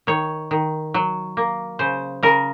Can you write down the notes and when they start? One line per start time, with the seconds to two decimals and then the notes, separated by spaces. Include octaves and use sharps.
0.07 D#3 C#5
0.51 D#3
0.94 F#3
1.37 A#3
1.79 C#3 C5
2.23 C#3 A#4